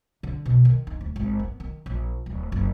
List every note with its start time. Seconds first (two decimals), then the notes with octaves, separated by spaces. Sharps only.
0.23 D3
0.46 B2
0.65 D#3
0.87 D#4
1.01 D2
1.16 G#1
1.39 B3
1.60 D#3
1.86 A#1
2.26 D1
2.52 F#1